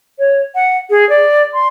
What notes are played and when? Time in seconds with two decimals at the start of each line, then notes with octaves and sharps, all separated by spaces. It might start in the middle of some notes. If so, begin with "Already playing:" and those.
0.19 C#5
0.55 F#5
0.90 G#4
1.09 D5
1.53 C6